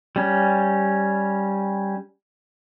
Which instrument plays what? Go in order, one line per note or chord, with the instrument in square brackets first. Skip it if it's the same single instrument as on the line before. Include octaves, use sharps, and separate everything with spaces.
[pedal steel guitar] G3 C#4